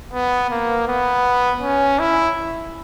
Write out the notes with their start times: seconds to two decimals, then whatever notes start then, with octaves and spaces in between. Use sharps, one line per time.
0.13 B3
0.50 A#3
0.88 B3
1.62 C#4
1.99 E4